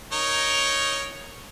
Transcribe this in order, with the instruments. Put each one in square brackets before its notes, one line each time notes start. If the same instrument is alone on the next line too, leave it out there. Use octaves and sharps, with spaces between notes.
[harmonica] D#4 A#4 C#5